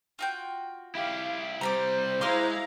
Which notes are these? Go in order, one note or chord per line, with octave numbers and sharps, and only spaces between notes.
F4 F#4 G5
E4 G4 F5
C2 G3 C5 A#5 B5 D6
G#3 E4 F5 A#5 C6 D6 F6